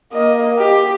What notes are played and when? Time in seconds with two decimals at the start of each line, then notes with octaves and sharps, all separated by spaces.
0.13 A#3 D#5
0.59 G4